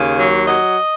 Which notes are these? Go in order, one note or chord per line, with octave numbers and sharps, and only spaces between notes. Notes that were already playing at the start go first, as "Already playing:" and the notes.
Already playing: D#2 C#3
F#3
F#3 D#5